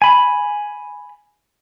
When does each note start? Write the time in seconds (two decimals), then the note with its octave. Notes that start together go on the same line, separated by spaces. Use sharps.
0.02 G#5 B5